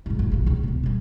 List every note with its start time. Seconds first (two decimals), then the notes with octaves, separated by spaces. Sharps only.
0.06 C2 G#2
0.19 D#1 F2
0.32 A#1 E3
0.46 C#2 C#3
0.63 D#2 B2
0.83 C#3 G3